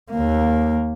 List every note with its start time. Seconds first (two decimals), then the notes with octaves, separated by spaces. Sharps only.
0.11 D#2 A#3